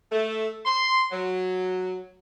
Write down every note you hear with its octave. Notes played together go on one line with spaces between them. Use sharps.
A3
C6
F#3